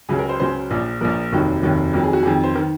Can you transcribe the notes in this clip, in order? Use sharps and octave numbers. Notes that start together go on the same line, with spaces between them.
C#2 C#3 F#3 G#4
A#4
C5
C#2 C#3 F#3 C5
A#1 A#2 F3
A#1 A#2 F3 A#4
F1 D#2 D#3 F#3
F1 D#2 D#3 F#3
F2 D#3 F#3 A#4
G#4
F#4
F2 D#3 F#3 G#4
C5
D#3 A#4